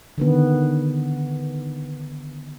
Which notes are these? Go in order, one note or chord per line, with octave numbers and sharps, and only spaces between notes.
D3 D#3 B3